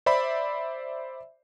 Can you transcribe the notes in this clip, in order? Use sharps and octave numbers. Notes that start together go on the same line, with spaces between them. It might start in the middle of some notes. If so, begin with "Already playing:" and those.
C5 D5 E5 B5